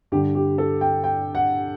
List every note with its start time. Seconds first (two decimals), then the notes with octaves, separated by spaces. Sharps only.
0.12 G2 D3 G3 G4
0.35 G4
0.58 A4
0.81 G5
1.04 G5
1.35 F#5